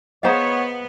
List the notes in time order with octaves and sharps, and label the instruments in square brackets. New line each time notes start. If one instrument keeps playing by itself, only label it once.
[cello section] B3 [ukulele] G#4 C5 F5 [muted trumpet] C#5 [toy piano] D#5 F#5 A#5